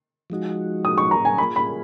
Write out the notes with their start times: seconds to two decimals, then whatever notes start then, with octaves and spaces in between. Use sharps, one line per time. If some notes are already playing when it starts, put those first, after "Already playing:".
0.30 F3 G#3 D#4 F#4
0.85 D#6
0.98 C#6
1.11 A#5
1.25 G#5
1.38 A#3 F4 G#4 B5
1.56 B5